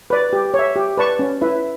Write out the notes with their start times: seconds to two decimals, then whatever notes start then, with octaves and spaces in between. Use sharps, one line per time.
0.10 B4 D5
0.33 G4
0.54 C#5
0.59 E5
0.76 G4
0.97 B4 D5 A5 C#6
1.19 C#4
1.41 E4 B4 E5